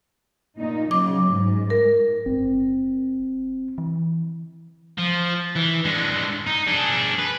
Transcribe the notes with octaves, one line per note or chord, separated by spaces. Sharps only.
A#2 D#4
C#3 F#3 D6
G#2
A#4
F#1 C4
E3
F3
E3
D3 G#3
D#4
D4 G#4
B4